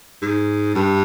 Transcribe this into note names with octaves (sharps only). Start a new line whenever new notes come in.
G#2
G2